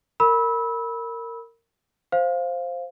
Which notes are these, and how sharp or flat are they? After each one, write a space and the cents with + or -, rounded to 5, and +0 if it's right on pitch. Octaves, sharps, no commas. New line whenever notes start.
A#4 -20 B5 -15 E6 -25
C5 +5 F5 +0